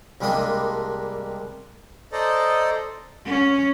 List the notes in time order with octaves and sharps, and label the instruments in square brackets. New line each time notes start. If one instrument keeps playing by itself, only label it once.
[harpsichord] C2 G3 G#3 A#3 D4 D#6
[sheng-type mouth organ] A4 C5 D5 D#5 A#5
[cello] C#4